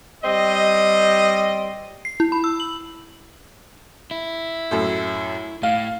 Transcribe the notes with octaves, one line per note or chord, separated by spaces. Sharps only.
G3 C4 D#5
C7
E4
B5
E6
F#7
E4
F#2 A2
A2 F5